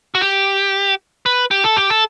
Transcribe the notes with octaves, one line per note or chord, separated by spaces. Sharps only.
F#4
G4
B4
G4
A4
G4
A4